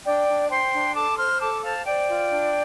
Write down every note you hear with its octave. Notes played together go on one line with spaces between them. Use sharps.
D4 D5 G5
D4
C5 G5 C6
D4
A4 A5 D6
C5 C6 F6
A4 A5 D6
C5 F5 A5
C5 D5 G5
F4
D4